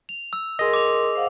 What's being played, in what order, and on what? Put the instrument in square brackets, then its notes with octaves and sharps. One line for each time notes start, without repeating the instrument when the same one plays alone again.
[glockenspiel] F7
E6
[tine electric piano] G#4 D#5 [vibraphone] A#4 C6
[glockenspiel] D6 F7
[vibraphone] C5 F5 F#5